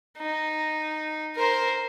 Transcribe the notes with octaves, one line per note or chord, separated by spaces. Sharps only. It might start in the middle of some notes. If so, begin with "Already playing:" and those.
D#4
A#4 C5